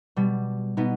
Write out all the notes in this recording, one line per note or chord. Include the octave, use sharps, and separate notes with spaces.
B2 G3
B2 B3 D#4